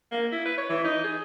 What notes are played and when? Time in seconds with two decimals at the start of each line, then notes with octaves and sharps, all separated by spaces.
0.12 A#3
0.32 E4
0.45 B4
0.58 C#5
0.69 E3
0.84 D#4
1.04 G#4